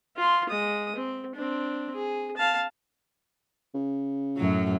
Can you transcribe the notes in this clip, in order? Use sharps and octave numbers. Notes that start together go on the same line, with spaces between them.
F4 C6
G#3 D#6
C4
C4 D4
G#4
F5 A5
C#3
F#2 A2 F#3